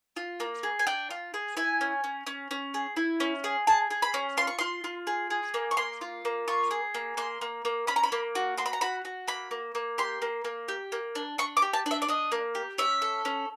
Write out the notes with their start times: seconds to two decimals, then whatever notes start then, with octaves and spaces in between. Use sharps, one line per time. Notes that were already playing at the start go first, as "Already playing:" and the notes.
0.16 F4
0.40 A#3
0.63 G#4
0.79 G#5
0.87 D4 G5
1.10 F4
1.34 G#4
1.57 E4 G#5
1.81 C#4
2.04 C#4
2.27 C#4
2.51 C#4
2.74 G#4
2.96 E4
3.20 C#4
3.44 G#4
3.67 G#4 A5
3.90 G#4
4.02 B5
4.14 C#4
4.37 F4 C6
4.47 C#6
4.59 F4 C6
4.84 F4
5.07 G#4
5.30 G#4
5.54 A#3
5.71 C#6
5.77 A#3 C6
6.01 F4
6.25 A#3
6.48 F4 C#6
6.71 G#4
6.94 A#3
7.17 A#3 C6
7.41 A#3
7.65 A#3
7.87 C#4 B5
7.96 A#5
8.03 B5
8.12 A#3
8.35 F#4
8.57 F#4 C6
8.66 B5
8.73 A#5
8.81 F#4 B5
9.05 F#4
9.28 A#3 B5
9.51 A#3
9.75 A#3
9.98 G4 C6
10.22 A#3
10.45 A#3
10.68 G4
10.92 A#3
11.15 D4
11.38 D4 C#6
11.57 D6
11.62 G4
11.73 A5
11.86 D4
11.91 E5
12.02 D5
12.08 D4 D#5
12.32 A#3
12.55 G4
12.78 C#4 E5
13.02 A4
13.25 C#4